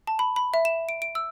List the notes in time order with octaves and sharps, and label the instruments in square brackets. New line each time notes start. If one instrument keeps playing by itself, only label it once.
[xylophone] A5
B5
B5
E5
E7
D7
D7
E6